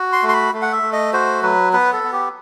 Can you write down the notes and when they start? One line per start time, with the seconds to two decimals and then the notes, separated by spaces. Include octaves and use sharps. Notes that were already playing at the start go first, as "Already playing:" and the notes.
Already playing: F#4
0.13 C6
0.23 A3
0.29 C6
0.33 B5
0.53 A3
0.62 F#5
0.72 E5
0.82 A3
0.93 D#5
1.13 F#4 C5
1.42 F#3 B4
1.73 B3 B4
1.93 A4
2.03 B3
2.13 G4